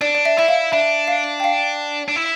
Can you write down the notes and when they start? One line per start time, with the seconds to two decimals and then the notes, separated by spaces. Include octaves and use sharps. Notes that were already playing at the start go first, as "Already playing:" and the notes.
0.01 D4 D5
0.15 D5
0.25 E5
0.37 E4 E5
0.48 F5
0.73 D4 E5
1.08 F5
1.40 G5
1.44 F5
2.08 D4
2.16 E4